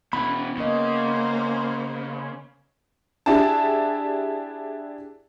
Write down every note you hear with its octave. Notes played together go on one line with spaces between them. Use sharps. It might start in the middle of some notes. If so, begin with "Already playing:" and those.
B2 E3 B3 C#4 B5
C#3 A#3 B3 C5 D#5
D4 E4 G4 G#4 A5